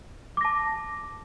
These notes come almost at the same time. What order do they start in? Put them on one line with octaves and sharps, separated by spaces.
D6 A#6 A5